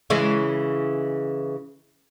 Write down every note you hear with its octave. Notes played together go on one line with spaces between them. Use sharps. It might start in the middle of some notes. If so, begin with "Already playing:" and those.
C#3 E3 G#3